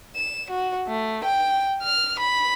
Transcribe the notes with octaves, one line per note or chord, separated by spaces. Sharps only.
E7
F#4
A3
G5
F6
B5